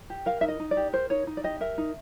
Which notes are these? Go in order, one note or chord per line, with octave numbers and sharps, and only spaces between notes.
G4
A#4 F5
D#4 E5
D#5
D#4
D5
G4
A#4 C5
D#4 C#5
D#4
D5
G4 D#5
A#4 E5
D#4